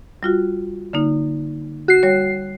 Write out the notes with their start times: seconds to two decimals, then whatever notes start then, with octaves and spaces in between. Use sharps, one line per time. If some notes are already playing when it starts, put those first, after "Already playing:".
0.23 G3 F4 F#4
0.93 D3 A#3 D#4
1.88 F#4 C7
2.03 G3 C#5